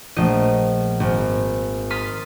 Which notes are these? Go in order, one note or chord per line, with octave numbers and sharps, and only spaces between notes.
A#1 F3 A3 D#5
G#1
C6 D#6 F6 A6 B6 C7